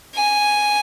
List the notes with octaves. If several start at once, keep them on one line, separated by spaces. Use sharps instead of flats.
G#5